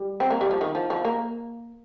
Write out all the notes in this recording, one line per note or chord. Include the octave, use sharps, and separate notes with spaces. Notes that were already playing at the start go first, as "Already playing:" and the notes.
Already playing: G3
C4
A#3
G3
F3
D#3
F3
F3
A#3